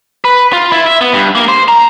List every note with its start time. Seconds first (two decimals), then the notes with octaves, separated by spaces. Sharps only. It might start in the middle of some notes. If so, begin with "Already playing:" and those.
0.25 B4
0.53 F4
0.72 E4
0.86 E5
1.01 B3
1.14 G2
1.35 A#3
1.48 C5
1.68 A#5